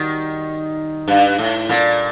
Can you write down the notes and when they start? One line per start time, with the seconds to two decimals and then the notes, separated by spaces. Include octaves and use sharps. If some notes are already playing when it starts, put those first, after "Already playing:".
Already playing: D#3 G3 F#4
1.08 G2
1.38 A2
1.69 A#2 G3 D4 A4